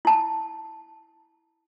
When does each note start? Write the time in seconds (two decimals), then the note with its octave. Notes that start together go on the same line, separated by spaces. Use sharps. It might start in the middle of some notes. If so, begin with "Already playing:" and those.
0.05 E4 A5